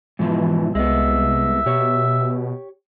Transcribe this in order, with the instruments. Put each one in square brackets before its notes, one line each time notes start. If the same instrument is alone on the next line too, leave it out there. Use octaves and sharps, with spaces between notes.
[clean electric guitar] G#2 B2 F3 [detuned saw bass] E3
[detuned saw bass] C2 [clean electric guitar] G#3 B3 [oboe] E5
[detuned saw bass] B2 [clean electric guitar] G4 C#5